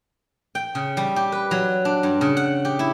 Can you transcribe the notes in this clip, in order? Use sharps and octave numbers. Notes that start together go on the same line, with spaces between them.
G5
C#3
G3
G4
B4
F#3
D4
G2
C#3
F#5
G4
E4